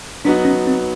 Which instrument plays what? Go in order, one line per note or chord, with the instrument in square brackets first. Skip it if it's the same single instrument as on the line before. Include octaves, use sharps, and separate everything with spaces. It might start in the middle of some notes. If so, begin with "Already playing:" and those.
[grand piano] F#3 B3 D#4 F#4 [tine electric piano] D4
[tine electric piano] C#4
C4